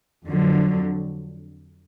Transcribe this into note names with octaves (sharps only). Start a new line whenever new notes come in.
F2 D3 F#3